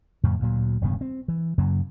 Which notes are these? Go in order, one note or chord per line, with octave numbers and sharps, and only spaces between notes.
F2 A2 C#3
D2 A#2 F#3
E1 G2 C#3 B3
C4
E3
F#2 C#3 F#3 A#3